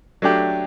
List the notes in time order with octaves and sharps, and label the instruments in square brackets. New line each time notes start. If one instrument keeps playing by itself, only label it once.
[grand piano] F#3 A3 D4 G4